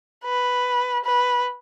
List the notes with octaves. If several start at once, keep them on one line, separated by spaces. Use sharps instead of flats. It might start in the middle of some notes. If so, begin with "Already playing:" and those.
B4
B4